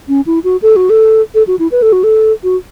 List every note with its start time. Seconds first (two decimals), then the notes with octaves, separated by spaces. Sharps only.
0.08 C#4
0.26 E4
0.44 F#4
0.62 A4
0.76 F#4
0.90 A4
1.35 A4
1.47 F#4
1.59 E4
1.72 B4
1.82 A4
1.93 F#4
2.04 A4
2.44 F#4